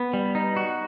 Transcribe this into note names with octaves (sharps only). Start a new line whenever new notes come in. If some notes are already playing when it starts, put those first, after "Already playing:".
Already playing: B3
G3
D#4
F#4